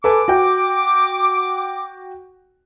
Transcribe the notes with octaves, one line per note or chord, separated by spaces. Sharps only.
A4 B4 G#5 D6
F#4 G5